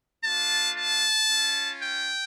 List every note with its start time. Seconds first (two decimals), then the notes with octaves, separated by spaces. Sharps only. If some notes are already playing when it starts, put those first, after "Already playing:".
0.23 A3 D4 F4 A5
0.76 A5
1.29 C#4 F4
1.82 G5